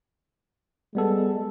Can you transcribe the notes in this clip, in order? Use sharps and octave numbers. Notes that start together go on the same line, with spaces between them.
G3 G#3 B3 A4